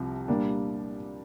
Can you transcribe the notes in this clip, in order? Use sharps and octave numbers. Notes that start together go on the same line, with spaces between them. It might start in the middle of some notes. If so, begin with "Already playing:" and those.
Already playing: C2 C3 F3
A#2 G3 A#3 D4